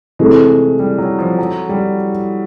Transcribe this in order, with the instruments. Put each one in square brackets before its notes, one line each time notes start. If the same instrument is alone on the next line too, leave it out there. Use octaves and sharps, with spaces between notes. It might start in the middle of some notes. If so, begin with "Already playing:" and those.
[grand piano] C3 E3 A3 [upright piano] G#3
[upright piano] G3
F#3
F3
F#3
G3